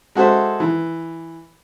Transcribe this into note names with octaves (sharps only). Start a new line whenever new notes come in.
G#3 F#4 A4 C5 E5
E3